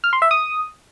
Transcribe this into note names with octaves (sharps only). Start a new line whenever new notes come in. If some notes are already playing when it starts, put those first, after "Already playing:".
F6
C6
E5
D#6